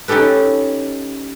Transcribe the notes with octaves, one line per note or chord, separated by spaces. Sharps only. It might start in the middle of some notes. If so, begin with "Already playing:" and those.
C#4 D#4 G4 A4 B4